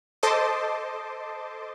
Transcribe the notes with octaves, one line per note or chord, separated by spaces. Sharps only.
A4 C5 D#5 A5 C6 D6